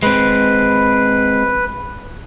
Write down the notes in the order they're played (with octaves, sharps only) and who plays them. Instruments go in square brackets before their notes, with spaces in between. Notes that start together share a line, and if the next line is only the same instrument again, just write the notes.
[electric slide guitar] G#3 C4 [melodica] B4